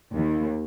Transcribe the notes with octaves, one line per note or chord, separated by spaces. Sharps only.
D#2